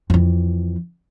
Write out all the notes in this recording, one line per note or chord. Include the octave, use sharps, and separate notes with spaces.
F2 E3